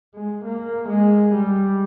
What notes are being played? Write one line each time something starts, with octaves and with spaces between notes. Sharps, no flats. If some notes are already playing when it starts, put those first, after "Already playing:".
G#3
A#3
G#3
G3